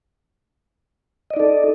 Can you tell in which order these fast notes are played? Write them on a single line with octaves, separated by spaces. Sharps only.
D#5 D5 D#4 A4